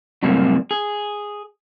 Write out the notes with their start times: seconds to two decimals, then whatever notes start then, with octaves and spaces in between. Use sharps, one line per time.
0.23 F#2 A2 C3 G3 A#3 C4
0.71 G#4